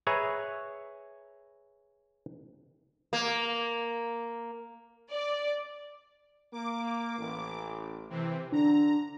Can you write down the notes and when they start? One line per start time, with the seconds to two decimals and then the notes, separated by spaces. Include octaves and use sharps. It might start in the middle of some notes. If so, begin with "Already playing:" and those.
0.07 G#4 B4 C#5 E5 A#5
3.13 A#3
5.10 D5
6.52 A#3 D6
7.17 A1
8.10 C3 E3 C4
8.52 D3 D4 A#5